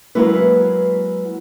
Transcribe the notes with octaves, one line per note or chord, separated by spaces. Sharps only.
F#3 G#3 A#3 E4 B4